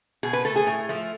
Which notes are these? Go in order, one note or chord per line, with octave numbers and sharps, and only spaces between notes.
B2 G#4
B4
A3 A4
G#4
A2
F3 A3